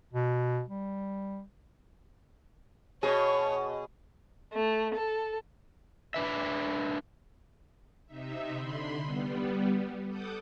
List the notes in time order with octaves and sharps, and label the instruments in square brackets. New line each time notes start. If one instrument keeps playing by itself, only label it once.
[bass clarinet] B2
G3
[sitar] B2 G#4 [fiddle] C#5
[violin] A3
A4
[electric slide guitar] D4 B4 E5
[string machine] C3 D#4 E5
D3 B5 C6
G3 B3
A4 F#5 D6 D#6 G6